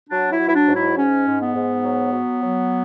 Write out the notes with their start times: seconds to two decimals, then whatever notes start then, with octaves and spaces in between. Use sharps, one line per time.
0.09 F#3 D4
0.31 E4
0.38 F#3
0.48 E4
0.54 D4
0.67 G#2
0.75 E4
0.97 G#2 C#4
1.26 G#2
1.41 B3
1.55 G#2
1.84 F#3
2.13 F#3
2.43 F#3